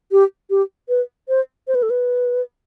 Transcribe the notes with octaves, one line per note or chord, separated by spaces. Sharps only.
G4
G4
B4
C5
C5
B4
A4
B4